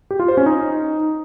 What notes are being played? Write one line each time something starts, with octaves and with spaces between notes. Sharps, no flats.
G4
F4
C5
C#4
D#4